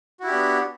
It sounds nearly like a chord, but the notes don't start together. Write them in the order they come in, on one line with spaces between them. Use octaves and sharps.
F#4 E4 G4 D4 B3